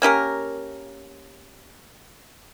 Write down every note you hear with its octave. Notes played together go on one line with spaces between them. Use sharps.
A#3 C#4 G4 A#4